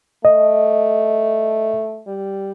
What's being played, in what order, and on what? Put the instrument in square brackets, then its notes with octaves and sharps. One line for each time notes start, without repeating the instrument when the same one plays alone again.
[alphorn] A3 [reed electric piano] D#5
[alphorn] G3